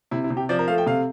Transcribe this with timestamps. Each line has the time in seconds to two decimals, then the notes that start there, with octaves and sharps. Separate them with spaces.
0.11 C3 E4
0.24 E4
0.30 C3
0.37 G4
0.49 F3 D5
0.59 A#4
0.68 A3 F5
0.78 G5
0.87 C3 F5